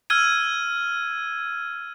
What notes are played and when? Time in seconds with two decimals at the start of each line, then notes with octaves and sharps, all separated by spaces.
0.10 E6 F6 G#6 D#7